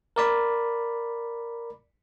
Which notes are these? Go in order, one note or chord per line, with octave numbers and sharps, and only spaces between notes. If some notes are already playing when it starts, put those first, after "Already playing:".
A#4 D5 B5